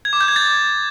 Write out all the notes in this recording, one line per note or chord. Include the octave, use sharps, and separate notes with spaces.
G#6
D6
G6
G#6
A6